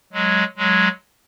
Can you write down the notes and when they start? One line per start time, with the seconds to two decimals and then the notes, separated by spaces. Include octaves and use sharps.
0.13 F#3 G#3
0.57 F#3 G#3